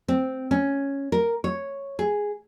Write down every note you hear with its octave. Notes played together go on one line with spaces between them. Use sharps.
C4
C#4
A#4
C#5
G#4